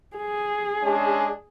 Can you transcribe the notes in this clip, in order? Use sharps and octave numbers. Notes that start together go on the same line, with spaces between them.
G#4
G#3 C#4 D4